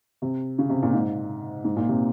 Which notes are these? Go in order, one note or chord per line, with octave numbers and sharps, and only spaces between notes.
C3
C#3
C3
A#2
G#2
G#2
A#2
C3